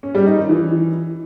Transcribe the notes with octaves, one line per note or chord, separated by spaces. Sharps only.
C#4
G3
D#4
D#3
E3